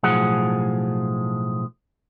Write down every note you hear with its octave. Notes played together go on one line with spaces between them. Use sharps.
B1 A2 F3 G#4 F#5